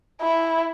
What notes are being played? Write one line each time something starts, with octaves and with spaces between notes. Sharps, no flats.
E4